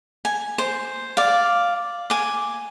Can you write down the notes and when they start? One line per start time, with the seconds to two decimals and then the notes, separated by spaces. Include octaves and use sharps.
0.25 G#5
0.58 C5
1.17 D5 F5
2.10 G#5 D6